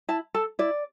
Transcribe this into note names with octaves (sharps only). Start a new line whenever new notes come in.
E4 A5
A4 A5
E4 D5